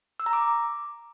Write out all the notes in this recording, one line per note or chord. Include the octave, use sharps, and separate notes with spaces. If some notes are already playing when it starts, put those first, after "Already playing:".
E6
A#5
D6